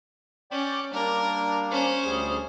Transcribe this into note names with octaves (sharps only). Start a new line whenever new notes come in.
C#4 D5 G5 D6
G3 A#3 D4 A#4
C#4 C5
D2 G3 G#4